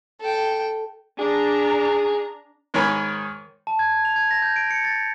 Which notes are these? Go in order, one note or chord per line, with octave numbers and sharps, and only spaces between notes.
A4 G5
D4 G#4 A#5
G#2 D#3 A#4 C#5 G#5 B5
A5
G#6
G#6
F7
G#6
A#6
G6
D7
C#7
A6